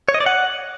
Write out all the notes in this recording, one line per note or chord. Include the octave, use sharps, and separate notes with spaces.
C#5
D#5
D5
F#5